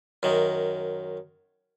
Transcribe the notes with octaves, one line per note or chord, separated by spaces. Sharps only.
F#2 D#3